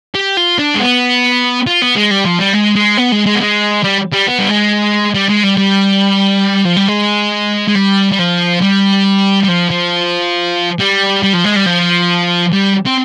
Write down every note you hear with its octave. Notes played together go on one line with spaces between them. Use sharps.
G4
F4
D4
G#3
B3
F4
B3
G#3
G3
F3
G3
G#3
G#3
B3
G#3
G#3
B3
G#3
G3
G3
B3
G3
G#3
G3
G#3
G3
G3
F3
G3
G#3
G#3
G3
G3
F3
G3
G3
F3
F3
G3
G3
F3
G#3
G3
F3
G3
C4